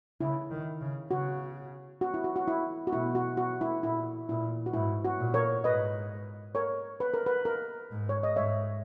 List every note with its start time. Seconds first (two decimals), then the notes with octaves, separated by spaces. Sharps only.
0.21 C#3 E4
0.51 D#3
0.81 C#3
1.11 C#3 F#4
2.01 F#4
2.14 E4
2.24 F#4
2.36 F#4
2.48 E4
2.87 F#4
2.93 B2 E4
3.15 F#4
3.37 F#4
3.61 E4
3.83 A#2 E4
4.29 A#2 E4
4.66 F#4
4.73 G#2 E4
5.05 F#4
5.20 A#2
5.34 A#4 C#5
5.64 G#2 B4 D#5
6.55 A#4 C#5
7.00 B4
7.14 A#4
7.26 B4
7.45 A#4
7.91 G#2
8.09 C#5
8.23 D#5
8.36 G#2 C#5 E5